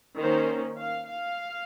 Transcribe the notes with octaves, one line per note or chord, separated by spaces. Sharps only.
D#3 A#3 C#4 C5
F5
F5